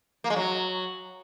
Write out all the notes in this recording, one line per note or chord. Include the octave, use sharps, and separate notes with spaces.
A#3
G#3
F#3